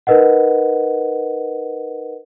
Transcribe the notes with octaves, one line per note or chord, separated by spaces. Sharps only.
D#4 A#4 B4 D#5 F#5